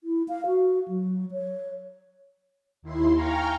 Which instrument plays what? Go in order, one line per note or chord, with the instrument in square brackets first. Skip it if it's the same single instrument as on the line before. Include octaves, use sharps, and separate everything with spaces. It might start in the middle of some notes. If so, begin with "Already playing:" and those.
[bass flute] E4
F5
F#4
F#3
C#5
[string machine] D#2 E4 C6
F5 G5 G#5 A#5 C#6 F6